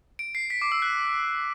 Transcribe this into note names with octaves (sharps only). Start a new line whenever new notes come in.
D7
C7
B6
D6
E6
F#6